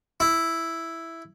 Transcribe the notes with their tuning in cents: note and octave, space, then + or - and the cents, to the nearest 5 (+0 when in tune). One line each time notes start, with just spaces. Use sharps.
E4 +0